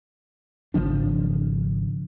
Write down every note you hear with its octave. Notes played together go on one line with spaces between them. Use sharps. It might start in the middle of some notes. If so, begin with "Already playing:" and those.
G#1 C#3 F3 D4